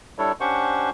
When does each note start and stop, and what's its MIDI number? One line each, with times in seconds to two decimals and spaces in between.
0.18 0.32 55
0.18 0.32 62
0.18 0.32 64
0.18 0.32 69
0.18 0.32 73
0.40 0.90 61
0.40 0.90 62
0.40 0.90 67
0.40 0.90 72
0.40 0.90 78
0.40 0.90 85